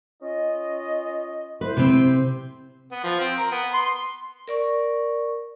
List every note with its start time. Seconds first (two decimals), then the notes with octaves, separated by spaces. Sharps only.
0.22 C#4 F4 D#5
1.61 E4 B4 C5
1.77 C3 C4
2.92 B3
3.04 F3
3.20 C4
3.38 A#4
3.52 B3
3.74 C6
4.48 A#4 D5 C#6